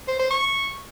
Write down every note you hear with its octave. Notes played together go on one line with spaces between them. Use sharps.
C5
C5
C#6